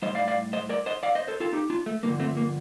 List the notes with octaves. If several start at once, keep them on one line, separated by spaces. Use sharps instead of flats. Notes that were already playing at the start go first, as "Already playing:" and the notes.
A2 G3 C5 D#5
D5 F5
D5 F5
C5 D#5
A#4 D5
C5 D#5
D5 F5
C5 D#5
A4 C5
F4 A4
D#4 G4
D4 F4
A3
G2 D3 F3 A#3
A3 C4
A#3